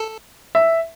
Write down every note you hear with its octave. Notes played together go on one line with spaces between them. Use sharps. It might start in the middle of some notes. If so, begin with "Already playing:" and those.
Already playing: A4
E5